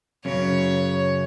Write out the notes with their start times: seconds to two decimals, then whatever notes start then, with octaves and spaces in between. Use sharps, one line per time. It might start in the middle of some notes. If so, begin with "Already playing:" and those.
0.25 F#2 C#3 C#5